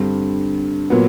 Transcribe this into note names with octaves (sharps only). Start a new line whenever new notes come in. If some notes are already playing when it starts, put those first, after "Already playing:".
Already playing: G2 D3 G3 C4
A#2 F#3 B3